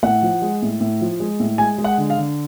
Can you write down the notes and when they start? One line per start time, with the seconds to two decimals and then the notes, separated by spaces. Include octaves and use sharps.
0.03 A2 F#5
0.22 F3
0.42 G#3
0.62 A2
0.80 A2
1.01 F3
1.20 G#3
1.40 A2
1.58 G#3 G#5
1.78 G#3
1.84 F#5
1.98 D3
2.10 F5
2.17 D3